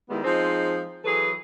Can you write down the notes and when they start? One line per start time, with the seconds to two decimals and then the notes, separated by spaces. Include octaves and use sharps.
0.10 D#3 G3 G#3 B3 E4
0.24 F3 G#3 C4 D#4
1.05 E3 F#3 G#4 A4 B4